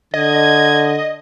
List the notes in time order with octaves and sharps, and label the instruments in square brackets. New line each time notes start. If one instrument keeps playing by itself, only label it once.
[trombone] D3 [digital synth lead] D#5 [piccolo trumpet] G#6